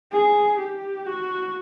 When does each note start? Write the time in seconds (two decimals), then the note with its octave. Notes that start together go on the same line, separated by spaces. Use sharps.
0.12 G#4
0.59 G4
1.06 F#4